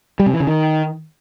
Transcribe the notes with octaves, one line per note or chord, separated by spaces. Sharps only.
G3
C3
E3
C#3
D#3